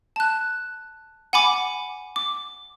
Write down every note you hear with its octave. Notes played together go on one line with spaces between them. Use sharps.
A5 F#6
F#5 G#5 B5 D6
D6